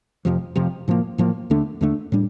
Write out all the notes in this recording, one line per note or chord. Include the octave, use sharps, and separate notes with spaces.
F1 F2 C3 F3
F1 F2 C3 F3
A2 F3 A#3
A2 F3 A#3
D#2 D3 A3 D4
D#2 D3 A3 D4
A2 G3 D4